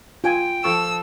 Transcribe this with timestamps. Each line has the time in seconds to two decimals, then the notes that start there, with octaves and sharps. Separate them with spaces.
0.24 F4 G5 G#5
0.64 F3 A4 C#6 E6